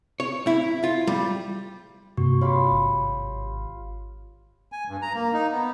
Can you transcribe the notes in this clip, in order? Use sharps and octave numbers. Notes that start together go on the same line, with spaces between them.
C#5
E4
F4
G3
G2 C3 A#3 F#4 C#6
F4 G4 C#5 B5 D6
G#1
G#5
G2
A#5
A#3
D#4
B3